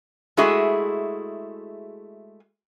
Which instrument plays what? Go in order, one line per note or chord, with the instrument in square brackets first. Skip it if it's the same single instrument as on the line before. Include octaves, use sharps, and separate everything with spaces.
[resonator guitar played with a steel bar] G#3 A3 E4 F#4 G#4